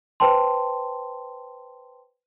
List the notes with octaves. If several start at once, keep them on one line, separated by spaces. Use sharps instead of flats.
B4 C5 G5 A5 C6